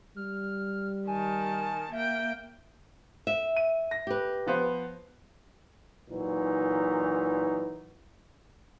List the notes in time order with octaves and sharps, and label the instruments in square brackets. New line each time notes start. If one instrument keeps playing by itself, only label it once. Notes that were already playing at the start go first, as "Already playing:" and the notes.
[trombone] G3 [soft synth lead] F6
[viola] D#3 A5 [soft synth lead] G#5
[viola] A#3 G5 [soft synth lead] E5
[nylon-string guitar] E5
[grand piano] D#7
A#6
[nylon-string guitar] G4 B4
[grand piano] F3 B3 C5
[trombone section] A#2 E3 F#3 D#4